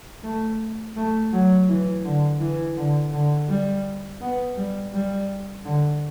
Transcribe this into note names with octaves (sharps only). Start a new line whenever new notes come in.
A3
A3
F#3
E3
D3
E3
D3
D3
G3
B3
G3
G3
D3